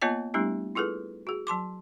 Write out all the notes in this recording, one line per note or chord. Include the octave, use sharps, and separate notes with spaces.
A#3 B3 F4 C#5 D#5 A5
G3 A3 B3 D4 E4 G4
E4 F4 G#4 A4 B4
F#4 G#4
F#3 A5 C6 D6